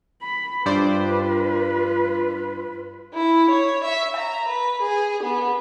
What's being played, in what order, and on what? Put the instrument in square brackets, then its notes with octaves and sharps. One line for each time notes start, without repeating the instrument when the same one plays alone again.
[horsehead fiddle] B5
[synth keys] G2 C5 D5 [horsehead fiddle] F4 B4
[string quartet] E4
C#5
E5
A#5
B4
G#4
B3